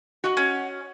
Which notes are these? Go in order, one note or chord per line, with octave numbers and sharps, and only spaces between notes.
F#4 D#5 F#5
C#4